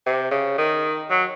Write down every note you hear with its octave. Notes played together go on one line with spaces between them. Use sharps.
C3
C#3
D#3
F#3